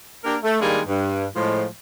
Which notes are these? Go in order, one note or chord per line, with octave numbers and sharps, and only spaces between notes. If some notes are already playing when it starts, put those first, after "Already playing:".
A#3 D4 G4 A#4
A3
D#3 G3 G#3 A#3 D4 G#4
G2
A2 F3 G#3